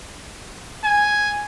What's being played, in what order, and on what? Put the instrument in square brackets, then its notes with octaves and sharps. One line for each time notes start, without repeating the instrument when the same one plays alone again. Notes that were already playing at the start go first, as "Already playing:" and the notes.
[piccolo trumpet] G#5